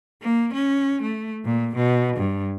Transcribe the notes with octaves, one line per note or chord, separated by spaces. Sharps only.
A#3
C#4
A3
A#2
B2
G2